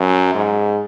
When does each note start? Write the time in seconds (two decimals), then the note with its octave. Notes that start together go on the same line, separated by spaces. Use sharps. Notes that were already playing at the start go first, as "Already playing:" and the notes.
Already playing: F#2
0.34 G#2